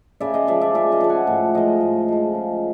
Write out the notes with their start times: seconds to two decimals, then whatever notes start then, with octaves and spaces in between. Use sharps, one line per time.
0.20 C#3 D5 E5
0.34 D#5 F5
0.47 F3 G#3 D5 E5
0.61 D5 E5
0.75 C#3 D5 E5
0.92 D#5 F5
1.01 F3 G#3
1.09 F#5 G#5
1.27 A2
1.55 F3 G#3 D#5 F5
1.81 A2
2.08 F3 G#3
2.35 C#3